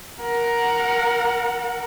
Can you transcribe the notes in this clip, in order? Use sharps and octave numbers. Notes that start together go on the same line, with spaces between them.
A#4 F#5